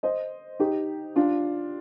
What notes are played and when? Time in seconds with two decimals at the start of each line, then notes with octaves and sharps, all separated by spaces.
0.03 C5 D#5
0.59 D#4 G4
1.16 D4 F4